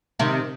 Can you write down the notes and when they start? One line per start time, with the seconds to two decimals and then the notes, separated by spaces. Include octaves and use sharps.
0.19 C3 D#3